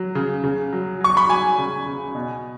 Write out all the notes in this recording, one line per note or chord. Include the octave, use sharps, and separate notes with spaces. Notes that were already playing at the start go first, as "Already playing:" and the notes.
Already playing: F#3
C#3
C#3
F#3
F#3 C#6
B5
F#3 G#5
C#3
C#3
B2